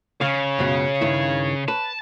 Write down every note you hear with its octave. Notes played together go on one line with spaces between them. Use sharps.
C#3 C#5 F5
C#2 F#2 B2
G2 D#3 E4
B4 A5